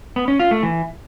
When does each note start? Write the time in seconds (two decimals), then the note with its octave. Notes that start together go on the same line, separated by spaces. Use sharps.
0.16 B3
0.28 C#4
0.40 F4
0.51 A3
0.63 E3